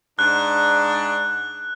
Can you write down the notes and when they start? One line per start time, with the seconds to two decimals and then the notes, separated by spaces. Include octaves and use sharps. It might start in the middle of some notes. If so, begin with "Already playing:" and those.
0.19 G#2 D4 F#6